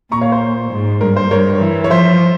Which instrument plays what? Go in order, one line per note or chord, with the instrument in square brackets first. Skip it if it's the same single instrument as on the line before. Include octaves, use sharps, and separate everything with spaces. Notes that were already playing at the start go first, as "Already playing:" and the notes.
[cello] A#2 [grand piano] A#5 C#6
[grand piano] C#5 F5
C5
[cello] G#2
[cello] G2 [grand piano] A#4
[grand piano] C5
[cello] G2 [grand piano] A#4 C#5
[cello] E3
[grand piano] C#5
[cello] F3 [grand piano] C5 E5